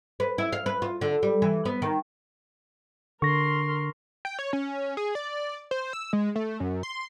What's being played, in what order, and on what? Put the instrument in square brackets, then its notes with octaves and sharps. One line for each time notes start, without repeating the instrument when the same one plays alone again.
[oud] B4
E4
F5
B4
F4
D3
G3
E3
B3
D#3
[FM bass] D3 [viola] A#4 C6 [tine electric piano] C#6 A#6
[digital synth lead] G5
C#5
C#4
G#4
D5
C5
E6
G#3
A3
F#2
C6